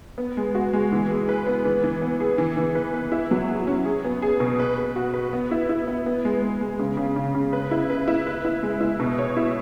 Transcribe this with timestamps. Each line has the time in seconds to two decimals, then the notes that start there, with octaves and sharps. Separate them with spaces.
0.18 B3
0.37 G#3
0.55 F#4
0.73 G#3
0.92 E3
1.11 G#4
1.29 B4
1.47 B3
1.65 E3
1.84 E3
2.02 B3
2.20 G#4
2.38 E3
2.57 E3
2.75 B4
2.94 B4
3.12 E4
3.31 F#3
3.49 G#4
3.67 C#4
3.85 G#4
4.04 B3
4.22 G#4
4.40 B2
4.60 B4
4.78 B4
4.96 F#4
5.13 B4
5.33 B3
5.51 E4
5.69 E4
5.87 B3
6.06 B3
6.25 G#3
6.42 B3
6.61 G#3
6.79 C#3
6.97 C#3
7.16 C#3
7.35 C#3
7.53 B4
7.71 E4
7.90 B4
8.08 E4
8.27 B4
8.45 E4
8.63 G#3
8.81 E4
9.00 B2
9.19 C#5
9.37 E4